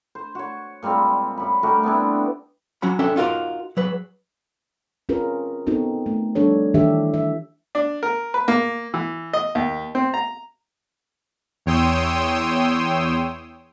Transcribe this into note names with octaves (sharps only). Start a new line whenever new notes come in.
C5
F#4 C#5
A#2 G3 G#3 C4
F#2 B5
G3 A3 F#4 A#4
B3 C4 D4 E4
F#3 C#4 F#4 B5
C#4 D4 A4 E5 G5
D#4 F4 F#4 A#4
F#3 G#4 B4
C4 C#4 F4 G#4 A#4 B4
B3 C4 D#4 F#4 A4
A3
F3 G3 D4 A4 C#5
D#3 E3 D4 G4 A4 E5
E5
D4
A#4
B4
A#3
E3
D#5
D#2
C4
A#5
E2 C#5 G5 C6 D#6 E6